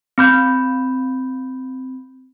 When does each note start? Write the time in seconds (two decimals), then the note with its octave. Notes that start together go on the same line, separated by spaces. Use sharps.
0.18 C4 B5 G6